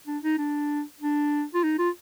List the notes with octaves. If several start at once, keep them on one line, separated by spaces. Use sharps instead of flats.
D4
D#4
D4
D4
F4
D#4
F4